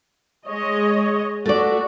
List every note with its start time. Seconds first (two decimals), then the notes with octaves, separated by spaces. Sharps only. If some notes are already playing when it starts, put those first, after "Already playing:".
0.47 G#3 C#5 D#5
1.46 A3 F#4 D5